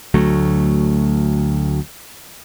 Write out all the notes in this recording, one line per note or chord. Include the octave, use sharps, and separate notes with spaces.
D2 F#3 A3